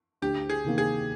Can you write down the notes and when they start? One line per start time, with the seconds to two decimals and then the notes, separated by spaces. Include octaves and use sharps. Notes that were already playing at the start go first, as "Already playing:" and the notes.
0.22 D2 G4
0.50 G#4
0.64 C3 D#3 A#3
0.78 G#4